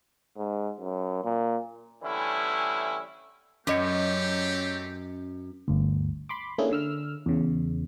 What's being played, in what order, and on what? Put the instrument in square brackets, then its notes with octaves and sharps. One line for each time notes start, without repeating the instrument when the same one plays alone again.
[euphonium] G#2
F#2
A#2
[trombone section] D3 E3 G3 A3 C#4 E4
[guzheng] F#2 [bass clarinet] F#3 [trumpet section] A3 C4 G4 [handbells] C#4 D#5 C#7
[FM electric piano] G1 D2
B5 C6 D6
A3 A#3 C#4 D4 E4 G#4
D3 E6 F6
E2 C#3